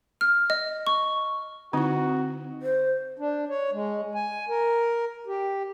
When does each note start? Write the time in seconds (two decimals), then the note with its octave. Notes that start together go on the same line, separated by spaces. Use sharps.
0.21 F6
0.50 D#5
0.87 C#6
1.73 D3 C4 D#4 E4 F#4
2.62 C5
3.19 D4
3.49 C#5
3.73 G#3
4.14 G#5
4.49 A#4
5.27 G4